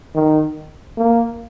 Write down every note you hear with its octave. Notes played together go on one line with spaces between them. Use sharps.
D#3
A#3